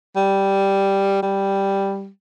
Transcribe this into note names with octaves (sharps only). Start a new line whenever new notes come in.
G3
G3